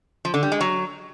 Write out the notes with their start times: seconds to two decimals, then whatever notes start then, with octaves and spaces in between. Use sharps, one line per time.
0.25 F3
0.34 D3
0.43 G3
0.52 G#3
0.61 F#3